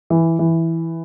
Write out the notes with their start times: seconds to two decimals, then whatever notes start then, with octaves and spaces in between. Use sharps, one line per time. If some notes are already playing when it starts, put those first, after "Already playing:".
0.10 E3
0.39 E3